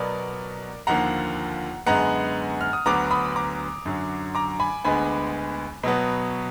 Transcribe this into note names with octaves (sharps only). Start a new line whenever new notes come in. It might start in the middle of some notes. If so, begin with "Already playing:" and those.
Already playing: B2 F#3 B3 A#4 D5
D#2 D3 F3 A#3 F#5 A#5
F#2 D3 G#3 B3 F#5 A#5
F6
D#6
D2 D3 F#3 B3 A#5 D6
B5 D#6
A#5 D6
F#2 D3 F#3
A#5 D6
G#5 B5
D2 D3 G#3 B3 G#5 B5
B2 F#3 B3